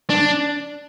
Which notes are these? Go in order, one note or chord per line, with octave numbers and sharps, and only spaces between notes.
D4